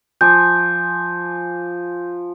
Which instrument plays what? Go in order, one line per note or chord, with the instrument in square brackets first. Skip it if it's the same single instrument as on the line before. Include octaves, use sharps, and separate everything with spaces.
[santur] F3 G#5 D6 [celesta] G6